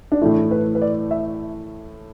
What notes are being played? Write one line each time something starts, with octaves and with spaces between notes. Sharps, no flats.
D4
A2 E3 A3 E4
B4
B4
D5
E5